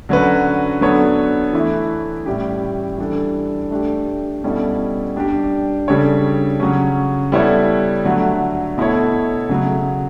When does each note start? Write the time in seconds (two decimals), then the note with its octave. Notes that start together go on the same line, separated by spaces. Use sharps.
0.09 D3 F#3 C#4 F#4 B4
0.81 F#3 B3 D4 A4 C#5
1.53 E3 A3 E4
2.26 A2 G3 C#4 E4 G4
2.98 E3 G3 D4 A4
3.70 A3 D4 G4
4.44 B2 G3 C#4 E4 A4
5.16 G3 D4 G4
5.88 C#3 G3 D4 A4 C#5
6.60 C#3 F#3 C#4
7.32 G3 B3 E4 A4 C#5
8.04 D3 F#3 A3
8.78 B2 A3 E4 A4 C#5
9.49 C#3 F#3 A3